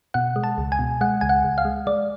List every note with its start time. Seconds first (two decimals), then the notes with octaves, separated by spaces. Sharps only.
0.14 B2 F#5
0.36 G#3
0.44 A5
0.58 C#2
0.72 G#5
0.79 B2
1.01 G#3 F#5
1.21 C#2 G#5
1.29 F#5
1.44 C#2
1.58 F5
1.65 G#3
1.87 G#3 D5